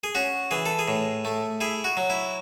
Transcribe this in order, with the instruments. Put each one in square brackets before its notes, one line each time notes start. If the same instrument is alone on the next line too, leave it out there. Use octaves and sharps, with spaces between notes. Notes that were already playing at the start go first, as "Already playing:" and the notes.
[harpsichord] G#4
C#4 F#4
E3 G#4
A4
G#4
A2
A3
E4 G#4
F#4
F#3
E4